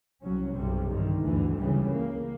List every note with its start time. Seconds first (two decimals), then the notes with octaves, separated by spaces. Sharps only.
0.21 C2 F#3 C#4
0.55 B1 F#2 C3 G3
0.90 G2 D3 D#3
1.23 D2 G2 D3 E3
1.58 C#2 C#3 E3 G3
1.95 A#3